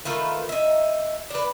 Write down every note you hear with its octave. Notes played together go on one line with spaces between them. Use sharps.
D#3 A3 F4 B4
D#4 E5
D4 B4